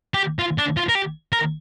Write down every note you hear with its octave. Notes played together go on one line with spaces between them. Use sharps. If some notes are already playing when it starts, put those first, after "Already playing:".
G4
F4
D4
F4
A#4
G4
A#4